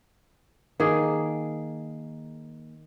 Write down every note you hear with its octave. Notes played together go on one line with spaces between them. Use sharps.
D#3 A#3 G#4